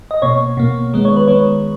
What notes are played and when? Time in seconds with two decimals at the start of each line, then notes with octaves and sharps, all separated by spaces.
0.11 D#5
0.22 B2 A#3 C#5
0.57 B2 A#3
0.93 D#3 G#3 B3
1.05 C#5
1.16 B4
1.28 D#3 G#3 B3 C#5